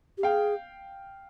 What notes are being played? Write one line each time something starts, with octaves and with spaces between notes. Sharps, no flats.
G4
G#4 F5 G5